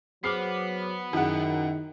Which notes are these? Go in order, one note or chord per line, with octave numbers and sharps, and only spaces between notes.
F#3 B3 G#4 C5 D6 F6 C7
F#2 D#3 E4 G#4 F#5